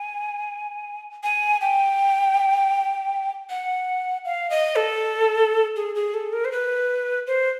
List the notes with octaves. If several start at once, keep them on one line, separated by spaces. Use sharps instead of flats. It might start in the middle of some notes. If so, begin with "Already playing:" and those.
Already playing: G#5
G#5
G5
F#5
F5
D#5
A4
G#4
G#4
A4
A#4
C5
B4
C5